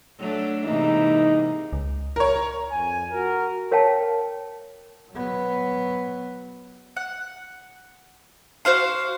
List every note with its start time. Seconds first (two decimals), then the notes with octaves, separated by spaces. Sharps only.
0.19 F#3 A3 D4
0.64 G#2 C3 E3 A#3 D#4
1.73 C#2
2.16 A#4 C#5
2.71 F2 G#5
3.12 F#4 A#4
3.71 A#4 C#5 F5 G5 A5
5.11 F#3 B3
6.97 F#5
8.65 F#4 C5 F5 C6